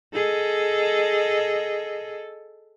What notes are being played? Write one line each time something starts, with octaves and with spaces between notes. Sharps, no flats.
G#4 A4 D#5